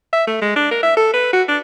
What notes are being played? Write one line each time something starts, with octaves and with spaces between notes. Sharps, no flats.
E5
A3
G#3
D4
A#4
E5
A4
B4
F#4
D4